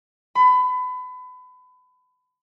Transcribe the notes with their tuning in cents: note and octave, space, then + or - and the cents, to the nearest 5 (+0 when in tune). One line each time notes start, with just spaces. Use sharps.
B5 +30